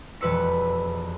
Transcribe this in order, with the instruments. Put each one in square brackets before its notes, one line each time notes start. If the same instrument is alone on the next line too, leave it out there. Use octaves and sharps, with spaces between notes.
[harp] E1 F2 B4 E6 C#7